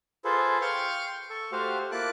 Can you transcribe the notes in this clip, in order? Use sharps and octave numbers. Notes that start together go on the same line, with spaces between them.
F4 G#4 A4 B4 C5
F5 G5 C6 C#6
A4 C#6
A3 F#4 G4 C5 F5
A#3 E4 F4 A5 D6 F#6